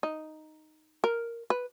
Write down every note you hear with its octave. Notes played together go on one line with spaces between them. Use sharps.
D#4
A#4
B4